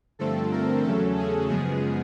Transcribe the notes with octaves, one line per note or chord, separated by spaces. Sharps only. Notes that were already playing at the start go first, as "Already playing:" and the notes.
G2 D3 F3 A3 C4 A4
A#4
E2 C#3 F#3 A3 C#4 A4
G#4
F#2 C#3 F3 G#3 B3 G#4